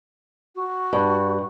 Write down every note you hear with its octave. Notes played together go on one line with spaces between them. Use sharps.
F#4
G2